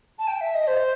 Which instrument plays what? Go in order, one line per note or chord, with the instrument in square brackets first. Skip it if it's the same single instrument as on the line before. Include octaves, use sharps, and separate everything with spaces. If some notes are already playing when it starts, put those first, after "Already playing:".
[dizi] A5
G5
E5
D#5
C5